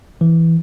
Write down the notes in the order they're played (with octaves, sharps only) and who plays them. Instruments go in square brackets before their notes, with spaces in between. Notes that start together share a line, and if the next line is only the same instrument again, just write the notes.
[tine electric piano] E3